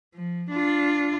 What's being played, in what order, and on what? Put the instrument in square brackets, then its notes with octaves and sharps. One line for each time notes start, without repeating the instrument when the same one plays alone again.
[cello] F3
D4 F4